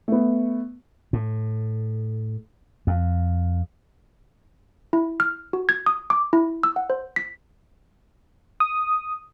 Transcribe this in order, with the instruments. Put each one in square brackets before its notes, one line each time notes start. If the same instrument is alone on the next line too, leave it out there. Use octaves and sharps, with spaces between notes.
[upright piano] A3 B3
[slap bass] A2
F2
[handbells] E4
F6
F#4
G#6
D#6
D6
E4
E6
F#5
C5
B6
[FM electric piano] D#6